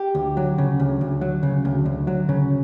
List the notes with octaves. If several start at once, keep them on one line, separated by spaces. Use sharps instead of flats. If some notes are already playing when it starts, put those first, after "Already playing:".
Already playing: G4
D2
F#3
C#3
D2
D2
F#3
C#3
D2
D2
F#3
C#3